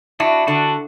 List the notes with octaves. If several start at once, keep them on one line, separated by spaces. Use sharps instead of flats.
D4 E4 F#4
D3 D4 F#4